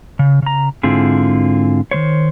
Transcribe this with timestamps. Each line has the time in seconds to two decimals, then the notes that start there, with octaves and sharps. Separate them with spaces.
0.19 C#3
0.42 C#3 A#5
0.83 G#2 D3 C4 E4 F4 G#4
1.91 D#3 E3 C5 C#5